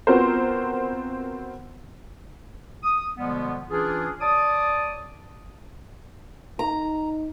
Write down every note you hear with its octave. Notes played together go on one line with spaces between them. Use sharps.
B3 C4 F4 F#4 A#4 C5
D#6
B2 D3 F3 G3 G#3 B3
E3 C#4 D4 F4 G#4
C#5 D5 A5 D6 D#6
D#4 A#5